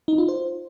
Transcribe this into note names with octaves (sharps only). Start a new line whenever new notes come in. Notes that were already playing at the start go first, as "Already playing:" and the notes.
D#4
F4
C5